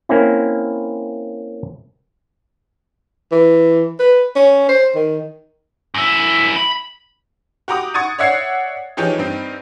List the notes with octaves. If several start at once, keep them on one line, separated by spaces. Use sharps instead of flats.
A#3 C4 C#4 E4
E3
B4
C#4
C5
D#3
F#2 E4
B5
F#4 G4 A#5 D6 D#6
F#5 C#6 D#6 G#6 A6 D#7
C#5 D5 E5 F#5 G#6 C7
E3 F3 D#4 G4 G#4 C#5
G2 C4 D#4